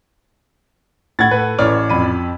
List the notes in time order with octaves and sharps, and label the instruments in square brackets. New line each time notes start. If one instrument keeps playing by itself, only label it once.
[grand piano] A2 F#5 [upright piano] G#6 A6
[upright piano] A4 B4
[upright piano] A1 D5 F6 [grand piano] C#5
[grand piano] F2 B5 D#7